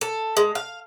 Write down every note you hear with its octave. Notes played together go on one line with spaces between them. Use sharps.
A4
G#3
F5